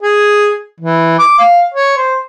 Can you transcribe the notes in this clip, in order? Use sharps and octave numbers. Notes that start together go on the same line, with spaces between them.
G#4
E3
D6
F5
C#5
C5